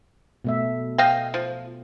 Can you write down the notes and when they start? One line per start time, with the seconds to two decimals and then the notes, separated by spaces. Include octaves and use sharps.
0.45 B2 A3 E5
0.98 D#5 F5 G5
1.34 F3